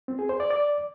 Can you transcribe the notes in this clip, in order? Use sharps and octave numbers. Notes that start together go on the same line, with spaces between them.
C4
G#4
C5
D5
D5